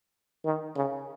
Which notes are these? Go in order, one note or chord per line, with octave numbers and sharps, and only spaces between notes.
D#3
C#3